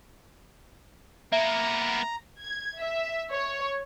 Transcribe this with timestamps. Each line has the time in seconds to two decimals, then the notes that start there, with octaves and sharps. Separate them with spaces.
1.32 A#3 B3 E5 A#5
2.42 G#6
2.79 E5
3.32 C#5